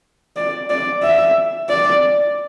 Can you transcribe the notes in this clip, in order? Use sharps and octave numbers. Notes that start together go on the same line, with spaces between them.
D5
D5
E5
D5